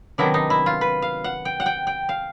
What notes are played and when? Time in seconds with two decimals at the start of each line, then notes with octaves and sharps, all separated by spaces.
0.18 C3 D#3 F#3 B3 D4 E4
0.34 D#4
0.50 E4
0.66 F4
0.81 B4
1.02 F5
1.24 F#5
1.45 G5
1.60 F#5
1.66 G5
1.87 G5
2.09 F5